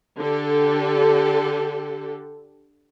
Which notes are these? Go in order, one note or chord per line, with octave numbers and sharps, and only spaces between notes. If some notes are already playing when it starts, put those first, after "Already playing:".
D3 G4 A4